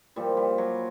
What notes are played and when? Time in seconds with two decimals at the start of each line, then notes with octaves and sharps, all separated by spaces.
0.16 A#2 F3 G3
0.37 G3
0.58 F#3